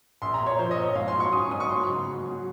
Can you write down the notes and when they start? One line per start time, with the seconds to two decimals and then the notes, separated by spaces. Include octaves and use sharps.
0.22 A#1 C6
0.34 A#5
0.40 A#2
0.46 C#5
0.59 F3 C5
0.71 D#5
0.77 A#2
0.84 C#5
0.96 G#2 F5
1.08 C6
1.14 F#3
1.20 C#6
1.32 C#4 D#6
1.51 G#2 D#6
1.60 C#6
1.69 F#3 C6
1.88 C#3
2.07 F#3
2.24 F#3